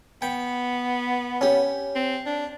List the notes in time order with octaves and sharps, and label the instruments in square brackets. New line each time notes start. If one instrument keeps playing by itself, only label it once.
[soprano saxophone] B3 [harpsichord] G5
[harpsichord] C#4 G4
[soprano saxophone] C4
D4